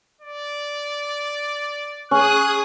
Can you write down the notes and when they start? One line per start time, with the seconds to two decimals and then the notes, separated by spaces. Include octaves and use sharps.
0.21 D5
2.11 C#4 G#4 D#6 F#6